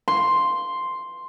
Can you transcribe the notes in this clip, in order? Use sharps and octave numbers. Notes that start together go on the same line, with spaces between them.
C6